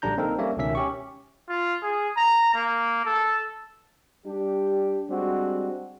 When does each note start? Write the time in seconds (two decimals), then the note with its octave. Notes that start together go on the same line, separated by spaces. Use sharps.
0.02 A#1 D3 G3 D4 A#5 G6
0.18 A#3 C4 D#4 A4 A#4
0.39 G3 A#3 C#4 A4 C#5 E5
0.57 C#2 B2 D#3 C#4 E5 B6
0.75 C#4 G4 C#6
1.49 F4
1.82 G#4
2.17 A#5
2.54 A#3
3.05 A4
4.25 G3 D4 G4
5.10 G3 G#3 C4 D4 F#4